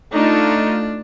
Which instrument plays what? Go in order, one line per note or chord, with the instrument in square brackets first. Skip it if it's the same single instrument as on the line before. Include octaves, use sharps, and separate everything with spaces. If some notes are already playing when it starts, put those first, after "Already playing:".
[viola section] A3 D#4 F4 [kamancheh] D4